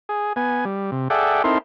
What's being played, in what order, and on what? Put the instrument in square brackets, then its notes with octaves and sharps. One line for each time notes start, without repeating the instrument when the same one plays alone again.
[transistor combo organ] G#4
B3 G#5
G3
C3
G#4 A4 D5 E5 F#5 G5
C4 D#4 E4 A4 A#4 C6